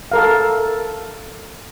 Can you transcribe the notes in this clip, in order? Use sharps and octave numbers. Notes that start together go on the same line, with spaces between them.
A4 A#4 F5